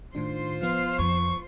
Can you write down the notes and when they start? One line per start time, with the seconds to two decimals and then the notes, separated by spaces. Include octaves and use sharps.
0.15 A2 D#3 D4 F4 C5
0.62 F3 B3 F5
0.99 F2 C#6